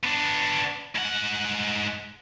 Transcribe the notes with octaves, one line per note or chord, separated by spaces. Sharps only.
B3 D4
G#2 F#5